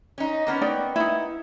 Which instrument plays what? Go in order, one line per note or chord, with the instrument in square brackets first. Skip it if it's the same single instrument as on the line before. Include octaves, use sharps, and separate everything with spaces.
[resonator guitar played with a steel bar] C#4 D#4
A#3 B3 C#4
[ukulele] D#4 D5 G5
D#4 E4